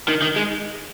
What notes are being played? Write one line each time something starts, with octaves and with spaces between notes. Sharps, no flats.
D#3
D#3
G#3